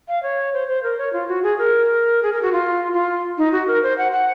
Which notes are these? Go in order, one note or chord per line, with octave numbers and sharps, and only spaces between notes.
F5
C#5
C5
C5
A#4
C#5
F4
F#4
G#4
A#4
G#4
A#4
F#4
F4
F4
D#4
F#4
A#4
C5
F#5
F#5